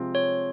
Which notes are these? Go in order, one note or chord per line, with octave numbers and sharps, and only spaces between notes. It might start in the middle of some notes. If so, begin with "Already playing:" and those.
Already playing: C3 F3 G#3 C4 F4
C#5